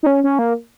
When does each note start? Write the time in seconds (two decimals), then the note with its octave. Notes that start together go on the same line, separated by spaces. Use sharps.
0.03 D#4
0.06 C#4
0.24 C#4
0.39 A#3